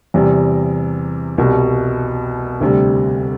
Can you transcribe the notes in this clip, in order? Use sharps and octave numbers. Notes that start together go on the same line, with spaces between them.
E2 C3 G3
C2 B2 G3
D2 C3 G3